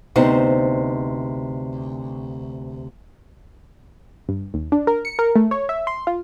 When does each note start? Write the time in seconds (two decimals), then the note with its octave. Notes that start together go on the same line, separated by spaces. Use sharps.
0.16 D2 C3 B3 D#4 C5
4.29 G2
4.54 D#2
4.72 D4
4.87 A#4
5.05 C#7
5.19 A#4
5.36 A3
5.51 C#5
5.69 E5
5.87 C6
6.07 F4